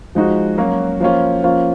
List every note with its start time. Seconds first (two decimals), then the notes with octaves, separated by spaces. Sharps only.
0.15 F3 G#3 D#4 F#4
0.58 F#3 A#3 C#4 F#4
1.00 F3 A#3 C#4 F4
1.43 F3 A#3 C#4 F4